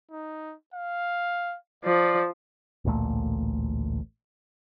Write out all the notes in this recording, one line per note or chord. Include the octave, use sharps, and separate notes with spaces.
D#4
F5
F3 D5
A1 D2 A#2 A3